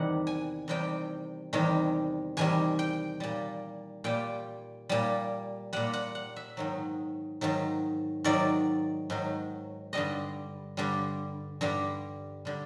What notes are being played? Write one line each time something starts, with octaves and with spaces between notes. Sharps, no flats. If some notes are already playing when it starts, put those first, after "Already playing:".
Already playing: E2 C3 D#3 G3 F#5
G#5
E2 C3 D#3 G3 G5
E2 C3 D#3 G3
E2 C3 D#3 G3 G#5
G5
A#2 G3
A#2 G3 G5
A#2 G3
A#2 G3 F#5
F#5
F#5
E5
G#2 D#3 F#3
G#2 D#3 F#3
G#2 D#3 F#3 D5
G#2 D#3 F#3
G2 D3 G3 D#5
G2 D3 G3
G2 D3 G3
D3 G3